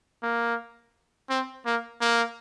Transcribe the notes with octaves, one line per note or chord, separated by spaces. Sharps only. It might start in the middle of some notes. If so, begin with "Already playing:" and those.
A#3
C4
A#3
A#3